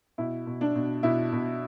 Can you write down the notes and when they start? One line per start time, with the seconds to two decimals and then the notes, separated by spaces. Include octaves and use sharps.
0.18 B2 E4
0.47 B2
0.61 D4
0.75 B2
1.03 B2 E4
1.32 B2